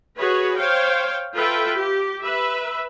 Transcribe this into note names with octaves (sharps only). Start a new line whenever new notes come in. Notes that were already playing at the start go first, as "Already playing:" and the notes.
F#4 G#4 B4 C#5
C5 C#5 F5 G5
F4 A4 B4 E5 G5
G4
B4 E5